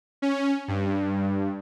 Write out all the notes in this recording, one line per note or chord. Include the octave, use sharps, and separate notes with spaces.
C#4
G2